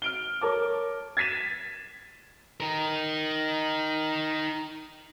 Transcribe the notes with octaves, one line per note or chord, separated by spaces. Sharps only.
F6 D7 G7
A#4 C#5 A5 D6
G#6 A6 B6 D#7 E7
D#4 A#4